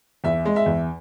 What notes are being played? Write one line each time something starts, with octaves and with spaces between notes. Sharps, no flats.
E2 E5
G#3
E5
E2